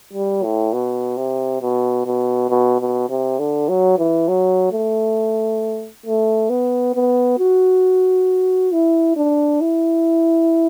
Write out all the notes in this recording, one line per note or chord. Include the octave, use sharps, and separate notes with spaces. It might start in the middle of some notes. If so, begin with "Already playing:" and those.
G3
A2
B2
C3
B2
B2
B2
B2
C3
D3
F#3
E3
F#3
A3
A3
B3
B3
F#4
E4
D4
E4